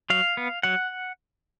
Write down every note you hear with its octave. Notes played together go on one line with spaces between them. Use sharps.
F#3 F5
B3
F#3 F#5